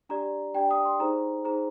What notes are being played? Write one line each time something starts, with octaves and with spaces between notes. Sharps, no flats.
D4 G4 D5 A#5
D4 G4 D5 G5
D#6
C6
D#4 G#4 C5 A#5
D#4 G#4 C5 A#5